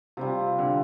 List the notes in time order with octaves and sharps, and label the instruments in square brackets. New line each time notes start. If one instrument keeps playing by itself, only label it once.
[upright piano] C3 [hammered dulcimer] G3 C4 F4
[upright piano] D3